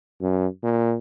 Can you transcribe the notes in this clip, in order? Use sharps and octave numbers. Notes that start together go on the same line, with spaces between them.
F#2
A#2